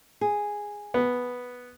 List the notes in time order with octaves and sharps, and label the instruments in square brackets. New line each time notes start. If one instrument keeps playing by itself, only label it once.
[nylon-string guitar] G#4
[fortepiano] B3